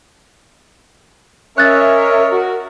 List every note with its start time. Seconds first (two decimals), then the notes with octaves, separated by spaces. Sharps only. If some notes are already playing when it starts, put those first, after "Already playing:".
1.58 C#4 A#4 C#5 D#5 E5 F#6 A6
2.31 F#4